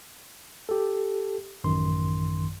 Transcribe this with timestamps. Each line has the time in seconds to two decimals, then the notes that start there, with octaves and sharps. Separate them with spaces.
0.69 G4 A4
1.64 A1 F#2 D#3 C6